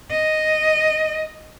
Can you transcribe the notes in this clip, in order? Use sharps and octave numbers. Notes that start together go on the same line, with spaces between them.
D#5